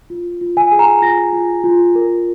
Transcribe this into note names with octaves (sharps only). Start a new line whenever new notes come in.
F4
F4
G#5
G#4
A#5
F4 A#6
F4
F4
A#4